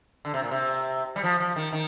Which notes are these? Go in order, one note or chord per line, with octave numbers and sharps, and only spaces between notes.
D3
C3
A#2
C3
G3
F3
F3
D#3
D#3